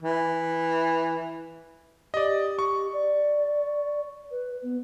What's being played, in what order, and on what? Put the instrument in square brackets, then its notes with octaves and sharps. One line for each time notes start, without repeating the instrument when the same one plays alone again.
[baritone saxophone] E3
[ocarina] G4 [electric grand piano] D5 D#5
[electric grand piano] C#6
[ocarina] D5
B4
B3